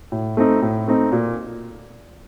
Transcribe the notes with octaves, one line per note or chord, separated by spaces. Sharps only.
A2
A3 C4 D#4
A2
A3 C4 D#4
A#2